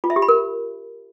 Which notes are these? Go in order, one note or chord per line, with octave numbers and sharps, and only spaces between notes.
F4
E5
G4
B5
A#4